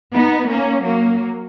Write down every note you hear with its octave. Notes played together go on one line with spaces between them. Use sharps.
B3 D#4
A#3 C#4
F#3 A#3